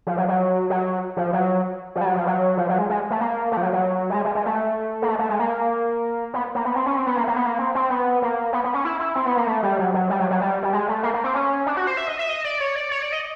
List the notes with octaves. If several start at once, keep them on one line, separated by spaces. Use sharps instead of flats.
F3
F#3
F#3
F#3
F3
F#3
F3
G3
F#3
F3
F#3
F3
F#3
G#3
G#3
A3
A#3
A3
F3
F#3
F#3
G3
G#3
G#3
G#3
A3
A#3
A3
A3
G#3
A#3
B3
A#3
B3
C4
C#4
C4
B3
A#3
A#3
B3
A#3
C4
C4
B3
A#3
B3
B3
C#4
E4
E4
C4
B3
A#3
A3
G3
F#3
F#3
G3
F#3
F#3
G3
G3
G#3
A3
A#3
A#3
C4
C#4
D4
F#4
C5
E5
D#5
E5
D#5
D5
C#5
D5
C#5
D5
D#5